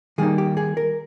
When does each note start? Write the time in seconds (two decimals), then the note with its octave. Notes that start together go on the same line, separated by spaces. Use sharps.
0.18 D#3 G3 A#3 D#4 G#4
0.38 G4
0.57 G#4
0.77 A#4